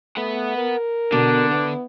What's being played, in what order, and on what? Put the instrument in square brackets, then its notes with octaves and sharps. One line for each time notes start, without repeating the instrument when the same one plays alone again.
[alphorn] A3 [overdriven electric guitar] B4 F#5
[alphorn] A#4
[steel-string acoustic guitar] B2 [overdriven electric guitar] D3 [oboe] D4
[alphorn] B3 [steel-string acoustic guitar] E4